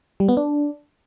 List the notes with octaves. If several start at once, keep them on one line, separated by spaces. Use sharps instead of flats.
G3
B3
D4